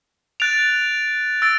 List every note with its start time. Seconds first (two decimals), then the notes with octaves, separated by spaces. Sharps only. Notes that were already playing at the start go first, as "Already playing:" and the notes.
0.40 F#6 A6 D7 F7
1.42 E6 A6 D7